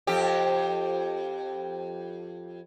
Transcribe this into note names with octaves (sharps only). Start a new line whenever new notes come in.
F2 G4